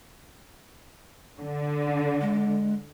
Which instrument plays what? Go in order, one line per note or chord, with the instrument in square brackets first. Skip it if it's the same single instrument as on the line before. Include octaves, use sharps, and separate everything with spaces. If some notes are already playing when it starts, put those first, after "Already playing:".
[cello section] D3
[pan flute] G#3